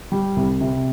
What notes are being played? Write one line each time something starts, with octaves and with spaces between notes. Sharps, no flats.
G3
C2
C3